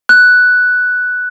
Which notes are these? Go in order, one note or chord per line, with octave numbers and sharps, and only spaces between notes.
F#6